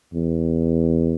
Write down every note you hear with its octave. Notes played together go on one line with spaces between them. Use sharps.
E2